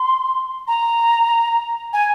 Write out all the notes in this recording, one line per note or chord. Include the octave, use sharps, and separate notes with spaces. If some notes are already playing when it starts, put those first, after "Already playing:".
Already playing: C6
A#5
G#5